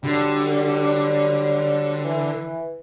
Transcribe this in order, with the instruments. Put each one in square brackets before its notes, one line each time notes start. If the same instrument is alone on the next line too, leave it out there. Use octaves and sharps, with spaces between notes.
[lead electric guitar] D3 [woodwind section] F#3 G3
[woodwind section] E3